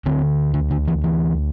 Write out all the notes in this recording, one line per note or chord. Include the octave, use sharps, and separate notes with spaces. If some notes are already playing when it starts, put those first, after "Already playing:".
D2 D3 C4
D3
D3
E3
E3